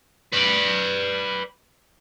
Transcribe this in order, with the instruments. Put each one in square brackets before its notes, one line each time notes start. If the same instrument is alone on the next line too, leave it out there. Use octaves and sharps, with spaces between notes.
[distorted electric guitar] B4 D5